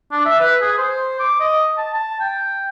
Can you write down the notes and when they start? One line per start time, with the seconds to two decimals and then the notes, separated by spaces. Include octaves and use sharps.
0.12 D4
0.26 E5
0.40 B4
0.62 G#4
0.78 C5
1.20 D6
1.40 D#5
1.78 A5
1.94 A5
2.21 G5